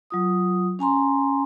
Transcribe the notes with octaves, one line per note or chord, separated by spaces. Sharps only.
F#3 F4 D#6
C#4 G#5 A#5 C6